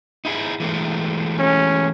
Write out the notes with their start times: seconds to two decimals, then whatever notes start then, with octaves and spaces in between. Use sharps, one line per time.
0.25 D#4 E4 G#4
0.60 E3 G#3 A3
1.39 C#4